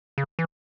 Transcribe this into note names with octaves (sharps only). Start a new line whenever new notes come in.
C#3
E3